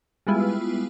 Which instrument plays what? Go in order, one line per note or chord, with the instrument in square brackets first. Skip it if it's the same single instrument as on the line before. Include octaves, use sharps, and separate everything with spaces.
[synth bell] G3 G#3 B3 E4 F4